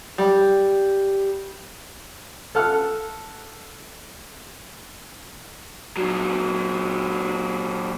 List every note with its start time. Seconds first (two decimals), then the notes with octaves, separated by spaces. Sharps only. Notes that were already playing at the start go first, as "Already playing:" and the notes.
0.18 G3
2.55 A4 F#5 F6
5.97 A#2 F#3